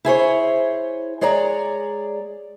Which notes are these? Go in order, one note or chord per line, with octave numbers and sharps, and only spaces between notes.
E4 G#4 C5 C#5
G#3 G#4 C#5 D5 A#5